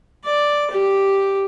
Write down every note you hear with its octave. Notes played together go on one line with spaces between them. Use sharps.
D5
G4